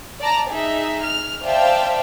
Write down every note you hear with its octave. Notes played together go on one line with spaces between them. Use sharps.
D5 A5 A#5
D#4 G#4 E5
F6
C5 D5 E5 F5 G5 A5